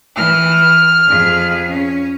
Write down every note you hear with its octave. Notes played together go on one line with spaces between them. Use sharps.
E3 F6
F2 G#4
C#4